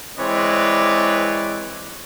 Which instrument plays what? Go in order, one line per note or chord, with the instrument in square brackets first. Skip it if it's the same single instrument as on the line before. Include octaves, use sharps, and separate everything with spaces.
[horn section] E3 G#3 C4 B4 C#5 D5